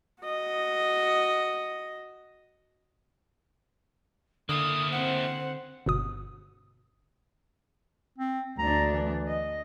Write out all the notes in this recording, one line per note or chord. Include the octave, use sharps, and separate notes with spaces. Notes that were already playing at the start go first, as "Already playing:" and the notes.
F#4 D#5
D3 A#3 E4 D#6
C4 C5 F#5
G1 B2 D#6
C4
D2 D4 A#5
E3
D#5